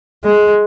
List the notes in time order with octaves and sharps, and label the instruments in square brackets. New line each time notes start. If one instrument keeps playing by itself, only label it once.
[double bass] G#3